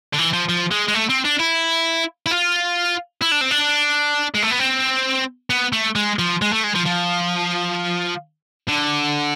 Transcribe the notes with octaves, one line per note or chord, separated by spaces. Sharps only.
D3
E3
F3
F3
G#3
G#3
A3
C4
D4
E4
E4
F4
E4
D4
C4
D4
G#3
A3
B3
C4
B3
A3
G#3
F3
G#3
A3
G#3
F3
F3
D3